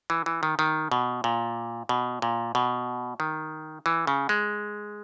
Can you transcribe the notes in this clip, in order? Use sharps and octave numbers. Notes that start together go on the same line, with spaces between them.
E3
E3
D#3
D#3
B2
A#2
B2
A#2
B2
D#3
E3
C#3
G#3